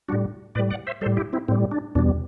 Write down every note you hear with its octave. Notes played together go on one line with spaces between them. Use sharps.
A2 G3 D4 F#4
A2 G3 B4 D5
D5 F#5
C5 E5
A2 G3 A4 C5
E4 G4
C4 E4
A2 G3 C4
D4
E2 B2 G3 D4